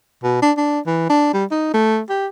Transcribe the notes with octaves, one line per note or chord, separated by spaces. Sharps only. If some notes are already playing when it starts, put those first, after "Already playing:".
B2
D4
D4
E3
D4
G3
D#4
A3
G4